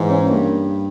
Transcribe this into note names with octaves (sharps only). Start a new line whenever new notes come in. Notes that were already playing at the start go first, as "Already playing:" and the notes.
Already playing: G#2 E3
C#4
G2 A#3